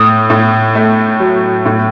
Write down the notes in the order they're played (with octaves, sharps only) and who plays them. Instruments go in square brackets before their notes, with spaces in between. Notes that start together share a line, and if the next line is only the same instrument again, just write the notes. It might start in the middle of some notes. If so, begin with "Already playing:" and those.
Already playing: [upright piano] A2 [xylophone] D#6
[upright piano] A2
A3
F#3
A2